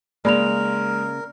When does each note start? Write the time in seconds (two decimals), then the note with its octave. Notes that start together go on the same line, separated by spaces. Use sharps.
0.25 C#3 G#3 A#3 A#4 D5 B5 F7